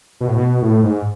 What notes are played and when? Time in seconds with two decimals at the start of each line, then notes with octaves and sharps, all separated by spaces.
0.21 B2
0.28 A2
0.36 B2
0.62 A2
0.83 G#2